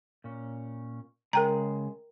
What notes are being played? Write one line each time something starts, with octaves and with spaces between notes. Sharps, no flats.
A#2 C#4
C#3 G#3 A#4 G5 A#5